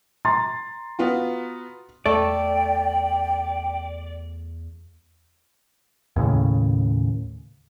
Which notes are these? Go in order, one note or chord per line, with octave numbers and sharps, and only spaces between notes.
A#5 C6 A6
B3 F4 F#4
E2 A3 D5 G5
D#2 A2 C#3